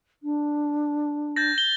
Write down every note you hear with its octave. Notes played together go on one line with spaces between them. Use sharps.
D4
G6 A6 A#6
G7